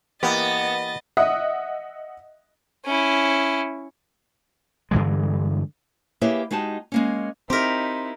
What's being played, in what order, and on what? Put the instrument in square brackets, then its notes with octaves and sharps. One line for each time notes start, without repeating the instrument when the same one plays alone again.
[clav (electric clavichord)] E3 A#3 G4 [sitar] B3 [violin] D#5 A6
[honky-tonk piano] D#5 E5 F#5 D#6
[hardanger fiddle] C#4 E4
[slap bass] G2 D3 E3 G#3
[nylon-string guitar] A#3 E4 G4 G#4 B4 C#5
G#3 D#4 F#4 G4 A5
G#3 A#3 C#4
[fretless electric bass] C4 [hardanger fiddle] D#4 E4 [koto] G4 A#4 [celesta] C6 B6